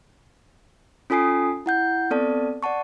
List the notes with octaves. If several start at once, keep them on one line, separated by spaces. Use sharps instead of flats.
C#4 F4 A4 G#5 D#6 C7
E4 F#5 G6
B3 C4 A4 D5 A5
D5 F#5 A5 C#6